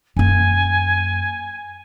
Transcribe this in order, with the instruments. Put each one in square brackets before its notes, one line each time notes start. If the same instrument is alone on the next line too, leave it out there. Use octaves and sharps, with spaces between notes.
[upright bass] F#2 A#3 [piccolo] G#5